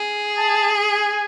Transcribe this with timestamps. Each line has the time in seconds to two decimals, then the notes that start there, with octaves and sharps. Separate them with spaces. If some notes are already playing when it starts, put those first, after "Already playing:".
Already playing: G#4
0.38 A5
0.91 G#5